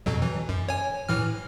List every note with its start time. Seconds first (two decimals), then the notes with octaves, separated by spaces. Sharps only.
0.06 F2 B2 F#3
0.22 E3
0.49 F#2
0.68 C#5 G#5
1.09 A2 E3 F6